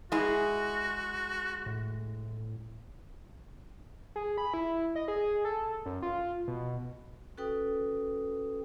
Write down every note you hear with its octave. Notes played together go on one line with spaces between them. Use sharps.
G#3 E4 F#4 G#4
A2
G#4
B5
E4
D#5
G#4
A4
F#2
F4
B2
C#4 F#4 A4 B4 G5 D#6